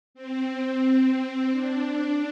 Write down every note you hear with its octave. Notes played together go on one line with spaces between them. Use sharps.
C4
D4